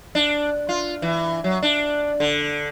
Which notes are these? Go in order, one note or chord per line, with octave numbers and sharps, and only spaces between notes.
D4
F4
E3
F#3
D4
D3